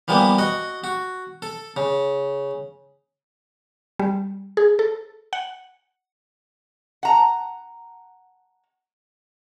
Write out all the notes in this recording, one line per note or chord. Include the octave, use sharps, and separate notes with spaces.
E3 F3 G3 A#3 B3
F#4 D#5 F#5
F#4
A4
C#3
G3
G#4
A4
F#5
F#5 A#5